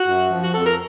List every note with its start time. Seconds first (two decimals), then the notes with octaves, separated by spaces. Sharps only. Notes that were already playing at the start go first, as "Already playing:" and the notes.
Already playing: F#4
0.08 F#2
0.31 F3
0.44 F#4
0.54 F2 A4
0.66 A#4